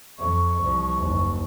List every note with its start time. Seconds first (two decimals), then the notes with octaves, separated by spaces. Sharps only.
0.18 F2 C#6
0.63 C2 F3
0.97 F#1 D#2